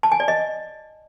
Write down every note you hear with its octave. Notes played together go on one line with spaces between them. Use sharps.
A5
G#5
D5
D#5